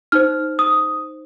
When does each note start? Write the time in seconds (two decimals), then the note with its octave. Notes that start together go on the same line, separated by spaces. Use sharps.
0.12 D#4 C5 F6
0.59 D#6